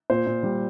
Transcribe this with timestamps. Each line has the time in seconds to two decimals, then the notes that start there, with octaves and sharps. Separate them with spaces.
0.10 A#2 C5
0.26 A#2
0.43 G3